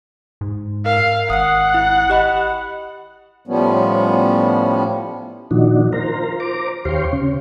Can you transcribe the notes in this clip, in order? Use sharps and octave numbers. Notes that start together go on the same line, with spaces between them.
G#2
A#4 F5
G#1 F#5 D#6 C7
E4
G4 D#5 B5
A2 F3 G3 B3 C#4
A#2 D#3 F3 D4 D#4 F#4
F4 A#4 C5 A#5
C5 A#5 D6
D#2 G4 C5 C#5 F5 C6
C#3 C#4